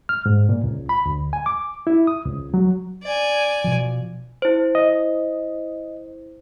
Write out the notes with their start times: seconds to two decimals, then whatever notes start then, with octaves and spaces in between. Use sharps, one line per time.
0.09 F6
0.26 G#2
0.49 A#2
0.64 C#2
0.89 B5
1.06 D2
1.33 G#5
1.46 D6
1.87 E4
2.07 D#6
2.25 C#2
2.54 F#3
3.04 D5 G#5
3.64 B2 F3
4.42 E4 C5
4.75 D#5